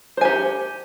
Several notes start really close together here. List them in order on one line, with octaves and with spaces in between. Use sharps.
C5 G#5 G4 F#5